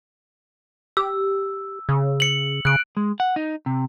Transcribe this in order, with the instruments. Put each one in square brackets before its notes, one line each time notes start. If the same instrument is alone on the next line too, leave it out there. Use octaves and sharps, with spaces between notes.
[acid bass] G4 [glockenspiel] E6
[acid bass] C#3
[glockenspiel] C#7 F#7
[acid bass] C#3 [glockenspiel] F#6 D7
[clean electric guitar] G#3
F#5
D#4
C3